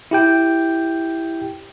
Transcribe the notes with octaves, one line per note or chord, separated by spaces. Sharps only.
E4 G4 G5